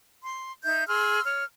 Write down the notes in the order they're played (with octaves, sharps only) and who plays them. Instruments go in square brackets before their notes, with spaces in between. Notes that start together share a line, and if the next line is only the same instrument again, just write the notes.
[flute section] C6
D#4 E5 G6
G#4 C6 E6 F6
C#5 F6